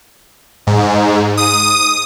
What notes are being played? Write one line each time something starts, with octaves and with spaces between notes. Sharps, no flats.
G#2
D#6